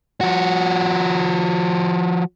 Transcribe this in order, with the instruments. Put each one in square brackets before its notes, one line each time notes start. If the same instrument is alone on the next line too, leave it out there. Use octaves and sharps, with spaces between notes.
[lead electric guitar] F3 F#4